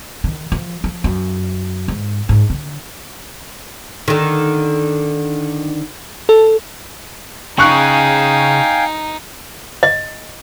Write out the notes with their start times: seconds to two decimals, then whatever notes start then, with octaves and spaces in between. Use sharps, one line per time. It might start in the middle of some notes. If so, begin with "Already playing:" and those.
0.24 D#3
0.52 F3
0.84 F3
1.04 F#2
1.88 G#2
2.29 G#2
2.50 D3
4.08 D3 D#3
6.29 A4
7.58 C#3 D#4 G#4 F5 G5 G#5 C#6 F#6
9.83 D#5